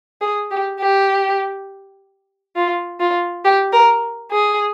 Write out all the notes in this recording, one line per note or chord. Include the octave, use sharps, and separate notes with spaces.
G#4
G4
G4
F4
F4
G4
A#4
G#4